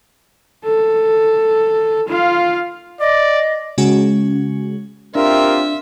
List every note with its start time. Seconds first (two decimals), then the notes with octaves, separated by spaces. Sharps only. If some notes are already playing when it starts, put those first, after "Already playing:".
0.65 A4
2.08 F4 F5
3.00 D5 D#5
3.78 C#3 G#3 C#4 F#4 G#4
5.15 C4 D4 F4 G4 A#4 E5